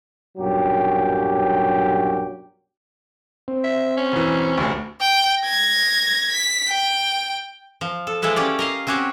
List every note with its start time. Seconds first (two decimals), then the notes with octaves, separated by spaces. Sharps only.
0.38 B1 G2 A#2 F#3 C#4 G4
3.48 C4
3.64 E5
3.97 C#4
4.12 E1 E3
4.57 F1 D2
5.00 G5
5.42 G#6 A#6
6.32 B6
6.68 G5
7.81 F3
8.07 A4
8.22 F3 G#3 E4 A4 B4
8.36 C#4 G4 D5
8.59 A#4 D#5 F5
8.87 C4 C#4 F#4 G4 C#5